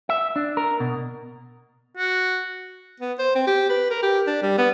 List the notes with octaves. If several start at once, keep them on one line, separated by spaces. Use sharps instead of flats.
E5
D4
A#4
B2
F#4
B3
C5
C4
G4
B4
A#4
G4
D4
G3
B3